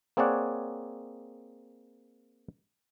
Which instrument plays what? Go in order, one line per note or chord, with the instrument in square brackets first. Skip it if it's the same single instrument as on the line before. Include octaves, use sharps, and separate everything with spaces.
[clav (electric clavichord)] A#3 C4 G#4 C#5 D5 F#5